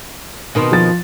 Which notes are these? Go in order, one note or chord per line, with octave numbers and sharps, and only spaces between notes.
B2 D#3 C4
F3 A6